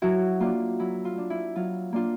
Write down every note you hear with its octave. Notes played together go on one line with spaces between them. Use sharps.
F#3 E4 F#4
A#3 D4 F4
F#3 E4
F4
A#3 D4
E4
F#3 F4
A#3 D4 F4